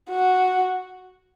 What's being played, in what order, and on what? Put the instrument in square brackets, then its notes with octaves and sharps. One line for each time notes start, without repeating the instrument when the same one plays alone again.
[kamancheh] F#4